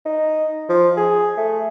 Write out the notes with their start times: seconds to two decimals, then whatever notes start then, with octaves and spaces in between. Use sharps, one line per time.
0.05 D#4
0.69 F3
0.97 G#4
1.37 A3